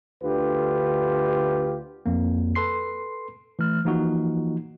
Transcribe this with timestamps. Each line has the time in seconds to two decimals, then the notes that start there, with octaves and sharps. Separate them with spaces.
0.23 D2 D3 F4 G4 B4
2.06 F2 A#3
2.55 A4 B4 C6 C7
3.59 E3 A3 F6
3.85 E3 F3 A#3 D#4 F4 F#4